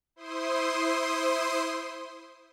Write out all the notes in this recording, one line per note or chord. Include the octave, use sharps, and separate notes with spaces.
E4 C5 C6 D#6